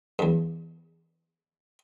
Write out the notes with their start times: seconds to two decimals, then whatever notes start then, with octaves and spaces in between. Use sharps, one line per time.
0.19 E2 G2